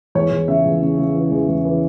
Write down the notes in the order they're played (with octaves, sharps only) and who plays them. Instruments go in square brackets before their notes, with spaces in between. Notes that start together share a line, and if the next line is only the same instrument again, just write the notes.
[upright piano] E2 C#5
E2
C#3 E5
E2
C#3
C#3
E3
E2
E2
E3